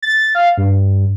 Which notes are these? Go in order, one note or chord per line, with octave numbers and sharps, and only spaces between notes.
A6
F5
G2